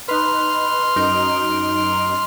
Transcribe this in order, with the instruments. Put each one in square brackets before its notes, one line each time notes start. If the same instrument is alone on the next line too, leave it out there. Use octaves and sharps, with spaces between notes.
[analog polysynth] D#4 B4 [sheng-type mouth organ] C6 F6
[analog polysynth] F#2 D#4 D7